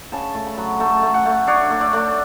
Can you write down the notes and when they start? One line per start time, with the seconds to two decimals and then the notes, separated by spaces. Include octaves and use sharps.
0.12 C#3 A5
0.34 A3
0.47 B5
0.58 F#3
0.80 A3 A5
1.03 A3
1.14 F#5
1.25 A3
1.48 D4 C#5
1.70 A3
1.81 D5
1.93 A3